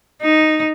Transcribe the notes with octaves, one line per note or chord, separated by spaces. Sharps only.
D#4